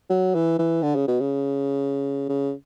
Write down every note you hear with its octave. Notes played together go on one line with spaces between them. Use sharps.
F#3
E3
E3
D3
C#3
B2
C#3
C#3